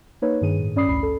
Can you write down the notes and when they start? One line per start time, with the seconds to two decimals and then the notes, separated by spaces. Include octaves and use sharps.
0.22 A#3 D#4 B4 C#5
0.41 G2 D#3 G#4 D#7
0.59 A2
0.76 G2 C#4 D5 B5 D#6 C7
0.88 A1 D2 B5 C7
1.03 A4